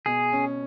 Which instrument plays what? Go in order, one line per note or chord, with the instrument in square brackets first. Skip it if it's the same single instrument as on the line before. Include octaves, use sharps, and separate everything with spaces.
[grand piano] B2 [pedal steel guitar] G#4
[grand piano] C#4